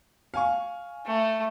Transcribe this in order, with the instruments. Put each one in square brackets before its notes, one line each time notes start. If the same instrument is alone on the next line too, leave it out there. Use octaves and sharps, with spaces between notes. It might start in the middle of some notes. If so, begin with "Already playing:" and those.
[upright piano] F5 G#5 C#6
[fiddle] A3